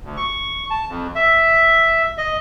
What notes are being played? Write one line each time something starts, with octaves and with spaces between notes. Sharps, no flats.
D2
C#6
A5
F2
E5
D#5